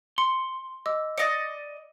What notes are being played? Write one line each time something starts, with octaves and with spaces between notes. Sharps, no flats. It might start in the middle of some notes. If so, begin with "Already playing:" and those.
C6 C#7
D#5 D6 E6
D5 D#5 A6 A#6 C#7